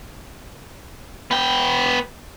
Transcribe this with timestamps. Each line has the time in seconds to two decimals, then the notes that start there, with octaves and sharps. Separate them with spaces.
1.31 B3 G5